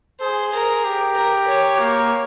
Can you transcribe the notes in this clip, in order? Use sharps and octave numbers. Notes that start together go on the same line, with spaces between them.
G#4 C5
A#4
G4
A#4
C#5
A#3